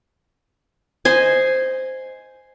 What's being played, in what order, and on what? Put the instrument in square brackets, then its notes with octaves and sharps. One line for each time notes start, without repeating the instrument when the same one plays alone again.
[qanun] C5 D#5 G#5